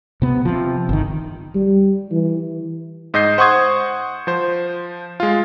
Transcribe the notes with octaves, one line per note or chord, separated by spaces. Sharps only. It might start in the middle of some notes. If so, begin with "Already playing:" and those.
C3 B3
C3 F3
G1 D#3
G3
E3
G#2 D#5 G6 C7
C5 F#5 C6 C#6 D#6 G#6
F3 C5
G#3 F4